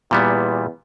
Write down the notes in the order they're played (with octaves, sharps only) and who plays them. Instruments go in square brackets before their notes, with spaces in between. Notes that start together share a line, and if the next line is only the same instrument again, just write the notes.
[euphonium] E2 [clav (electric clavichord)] A#2 G3 B3